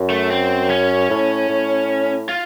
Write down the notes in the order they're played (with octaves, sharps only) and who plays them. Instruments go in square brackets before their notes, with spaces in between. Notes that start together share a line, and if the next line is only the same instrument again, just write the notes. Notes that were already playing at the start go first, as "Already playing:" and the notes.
Already playing: [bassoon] F#2
[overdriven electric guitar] A3
C4
C#4
[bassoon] A2
A2
[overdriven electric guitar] F4